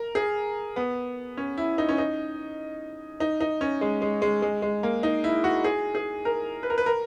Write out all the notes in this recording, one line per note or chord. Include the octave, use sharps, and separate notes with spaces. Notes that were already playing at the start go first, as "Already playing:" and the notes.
Already playing: A#4
G#4
B3
C#4
E4
D#4
C#4
D#4
D#4
D#4
C#4
G#3
G#3
G#3
G#3
G#3
A#3
D#4
E4
F#4
G#4
G#4
A#4
B4
A#4
B4
A#4